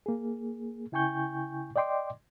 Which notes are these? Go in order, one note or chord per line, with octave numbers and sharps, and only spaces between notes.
A#3 G#4
C#3 E4 G5 G#5 C#6 G6
D5 D#5 G5 C6 D6